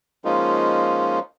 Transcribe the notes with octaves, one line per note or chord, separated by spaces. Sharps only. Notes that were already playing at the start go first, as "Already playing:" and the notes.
F3 G#3 A#3 C#4 D#4 F4